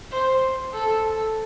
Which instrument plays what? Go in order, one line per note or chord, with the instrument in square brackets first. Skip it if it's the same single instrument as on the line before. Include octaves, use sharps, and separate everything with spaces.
[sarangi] C5
A4